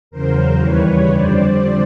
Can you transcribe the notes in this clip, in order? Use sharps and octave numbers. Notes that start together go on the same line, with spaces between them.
E2 C#3 F#3 A#4 C5
D#2 C#3 E3 G3 B4 C#5
F2 D3 G3 C5 D5